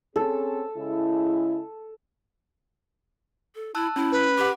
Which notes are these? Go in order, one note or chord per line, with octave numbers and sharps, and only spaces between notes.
C4 C#4 G#4 A4
C#3 G#3 E4
A4
E4 A5 E6 F#6
C#4 E4
B4
G4 F#5 D6